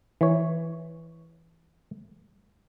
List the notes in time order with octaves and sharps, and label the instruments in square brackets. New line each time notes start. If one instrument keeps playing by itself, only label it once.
[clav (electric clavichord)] E3 C#5